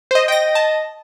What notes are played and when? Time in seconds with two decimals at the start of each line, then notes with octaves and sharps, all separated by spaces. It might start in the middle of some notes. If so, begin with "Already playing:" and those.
0.11 C5 D#5
0.28 D#5 G5 A#6
0.55 A5